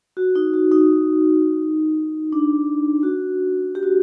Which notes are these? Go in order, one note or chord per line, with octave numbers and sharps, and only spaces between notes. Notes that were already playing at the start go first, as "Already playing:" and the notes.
F#4
D#4
F#4
D#4
D4
F#4
G4
F#4